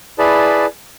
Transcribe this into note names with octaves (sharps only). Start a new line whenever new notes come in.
E4 G#4 B4 D5 A5 B5